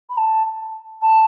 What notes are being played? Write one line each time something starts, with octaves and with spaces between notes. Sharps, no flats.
B5
A5
A5